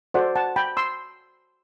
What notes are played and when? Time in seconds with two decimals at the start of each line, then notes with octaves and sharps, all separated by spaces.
0.14 F#4 A4 C5 D5 F#5
0.36 F#5 A5
0.56 G5 B5
0.77 C6 E6